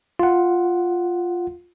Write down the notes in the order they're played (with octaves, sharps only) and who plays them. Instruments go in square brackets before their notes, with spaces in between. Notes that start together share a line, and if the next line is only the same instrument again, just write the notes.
[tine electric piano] F4 F#5